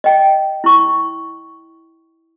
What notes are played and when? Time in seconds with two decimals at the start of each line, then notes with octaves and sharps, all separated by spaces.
0.04 D#5 G5
0.64 E4 C#6